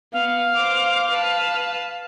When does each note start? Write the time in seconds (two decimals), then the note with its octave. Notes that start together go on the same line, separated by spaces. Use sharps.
0.13 B3 F5
0.55 C5 D6
1.10 B4 A5